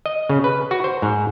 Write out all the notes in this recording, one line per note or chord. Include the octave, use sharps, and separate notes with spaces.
D#5
C#3
B4
F#4
C5
G#2